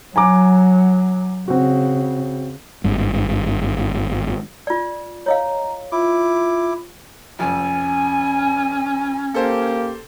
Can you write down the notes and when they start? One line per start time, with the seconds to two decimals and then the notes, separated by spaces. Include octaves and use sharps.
0.16 F#3 G#5 A#5 D6
1.48 C#3 C4 F#4
2.84 G#1 G2
4.67 F4 D5
5.26 C#5 D#5 F5 A#5
5.92 E4 F4 D6
7.39 F1 F2 C#4 G#5
9.34 A#3 G4 A4 C5